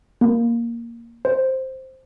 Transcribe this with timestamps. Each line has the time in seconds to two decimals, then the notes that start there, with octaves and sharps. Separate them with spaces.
0.21 A#3
1.25 C5